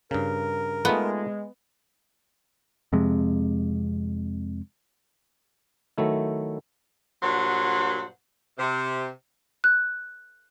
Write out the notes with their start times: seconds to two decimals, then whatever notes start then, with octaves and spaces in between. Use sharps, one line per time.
0.11 G2 C#3 A#4
0.85 G#3 A3 B3 D#4 F4
2.93 F2 C3 G#3
5.98 D#3 F#3 A3 E4
7.22 G2 A#2 F#3 C5 F#5
8.58 C3
9.64 F#6